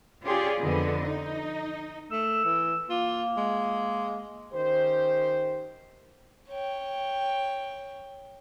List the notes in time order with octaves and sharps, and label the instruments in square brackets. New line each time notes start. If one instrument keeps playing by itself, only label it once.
[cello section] C#4 F4 G4 G#4 D5
F2 D3 B3 D#5
D#4
[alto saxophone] A3 [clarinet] E6
[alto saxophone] E3
[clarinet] A#3 [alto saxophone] F4
[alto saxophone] G#3
[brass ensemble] D#3 C#4 G4 C5
[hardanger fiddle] C#5 G5